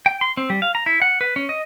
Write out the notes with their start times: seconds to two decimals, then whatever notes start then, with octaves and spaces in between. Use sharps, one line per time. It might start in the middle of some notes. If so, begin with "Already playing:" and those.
0.06 G5
0.21 C6
0.37 C4
0.50 G3
0.62 F5
0.75 A#5
0.86 E4
1.02 F#5
1.21 B4
1.36 C#4
1.49 D#5